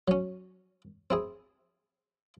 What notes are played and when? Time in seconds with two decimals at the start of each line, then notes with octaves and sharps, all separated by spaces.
0.08 F#3 C#4
1.10 C4 E4 G#4